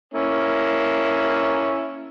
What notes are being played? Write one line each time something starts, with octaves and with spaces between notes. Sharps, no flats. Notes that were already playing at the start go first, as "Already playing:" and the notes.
A#3 C#4 E4